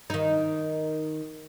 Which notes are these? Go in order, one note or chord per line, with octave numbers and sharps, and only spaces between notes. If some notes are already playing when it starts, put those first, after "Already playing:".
D#3 D#4